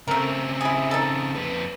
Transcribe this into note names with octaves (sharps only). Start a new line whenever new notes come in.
C#3 A3 C4 A#4
E4 G#4
D#4 A4
F2 B4